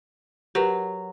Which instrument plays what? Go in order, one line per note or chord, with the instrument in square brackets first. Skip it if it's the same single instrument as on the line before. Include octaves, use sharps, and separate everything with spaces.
[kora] F#3 [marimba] G4 A#4 B4